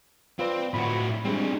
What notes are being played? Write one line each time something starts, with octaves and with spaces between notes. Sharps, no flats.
C4 F4 B4 D5
A2 F#4 B5
G3 G#3 C4 D4